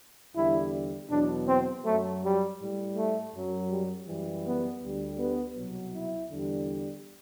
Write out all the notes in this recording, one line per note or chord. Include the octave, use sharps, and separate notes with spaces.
E2 D3 G3 E4
E2 B2 F#3 D4
C4
F#2 F#3 A3
G3
A2 G3
A3
F#2 F#3
G3
F#2 E3 G3
B3
D2 D3 G3
B3
C2 B2 F#3
E4
E2 D3 G3